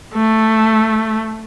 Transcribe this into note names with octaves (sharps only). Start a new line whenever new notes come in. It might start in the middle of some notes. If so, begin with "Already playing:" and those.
A3